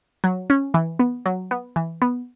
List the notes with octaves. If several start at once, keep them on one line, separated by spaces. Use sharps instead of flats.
F#3
C#4
E3
B3
F#3
B3
E3
B3